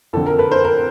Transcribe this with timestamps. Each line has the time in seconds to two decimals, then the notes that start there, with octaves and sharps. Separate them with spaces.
0.13 F2 D3 A4
0.27 A#4
0.38 A4 B4
0.51 A#4 C5
0.65 A#4